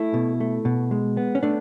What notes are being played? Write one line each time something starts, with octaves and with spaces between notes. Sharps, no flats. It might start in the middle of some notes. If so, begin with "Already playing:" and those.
Already playing: A3 E4
B2
A3
B2
G#3
B3
C#4
A3 D4